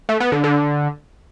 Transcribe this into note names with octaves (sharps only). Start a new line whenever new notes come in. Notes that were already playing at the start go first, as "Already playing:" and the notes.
A3
B3
D3
D3